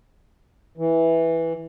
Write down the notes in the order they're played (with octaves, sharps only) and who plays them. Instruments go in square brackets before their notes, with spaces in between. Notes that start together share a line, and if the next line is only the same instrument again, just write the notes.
[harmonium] E3